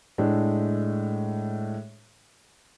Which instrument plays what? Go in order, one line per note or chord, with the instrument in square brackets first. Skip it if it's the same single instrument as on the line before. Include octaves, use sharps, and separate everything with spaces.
[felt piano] A2 G#3 A3 D4